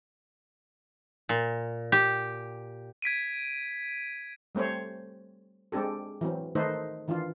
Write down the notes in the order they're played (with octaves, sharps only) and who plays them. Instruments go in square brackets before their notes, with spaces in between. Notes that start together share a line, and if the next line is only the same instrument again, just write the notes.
[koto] A#2
G4
[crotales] G#6 B6 D7 D#7
[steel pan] G3 A3 C4 C5 C#5
G#3 C4 D4 G4 A4
E3 F#3 C4
D#3 A3 D#4 A4 B4 C5
D#3 E3 D4 F4